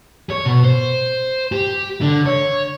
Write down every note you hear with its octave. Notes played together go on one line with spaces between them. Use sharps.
C#5
B2
C5
G4
D3
C#5